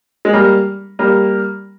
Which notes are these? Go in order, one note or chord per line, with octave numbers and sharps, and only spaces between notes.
G#3
G3 A#3
G3 A#3